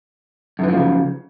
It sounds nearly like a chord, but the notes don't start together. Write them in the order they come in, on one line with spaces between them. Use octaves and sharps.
F#2 E3 F3 A2 C#3